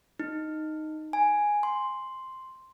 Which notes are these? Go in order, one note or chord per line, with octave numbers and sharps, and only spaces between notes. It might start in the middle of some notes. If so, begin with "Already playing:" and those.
D#4
G#5
C6